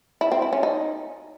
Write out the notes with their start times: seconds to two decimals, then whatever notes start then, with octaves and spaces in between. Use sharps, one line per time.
0.21 E4
0.32 C4
0.42 E4
0.53 C#4
0.63 D#4